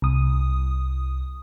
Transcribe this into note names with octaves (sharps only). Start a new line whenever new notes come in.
C2 D#6